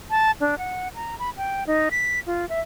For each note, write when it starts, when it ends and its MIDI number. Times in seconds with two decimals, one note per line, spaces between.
0.10 0.31 81
0.41 0.58 62
0.58 0.88 78
0.95 1.16 82
1.19 1.30 83
1.37 1.64 79
1.67 1.89 63
1.91 2.20 95
2.27 2.47 65
2.49 2.60 76